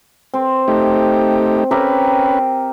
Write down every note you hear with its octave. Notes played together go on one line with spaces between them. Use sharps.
C4
A3 D#4 G4
C#4 G4 A#4 B4 E5